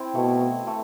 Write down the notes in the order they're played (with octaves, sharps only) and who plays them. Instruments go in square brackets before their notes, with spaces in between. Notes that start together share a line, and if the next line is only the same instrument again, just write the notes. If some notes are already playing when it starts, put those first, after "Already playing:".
Already playing: [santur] C4 E4
[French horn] B2 [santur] A3
[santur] A3
A3